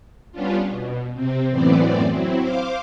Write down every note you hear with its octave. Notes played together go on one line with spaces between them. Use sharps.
G3 B3 C#4 D4 F4
B2
C3 C4
F#2 A2 E3 B3 C4 D5
F#3 C4 E4
C5 F5 D6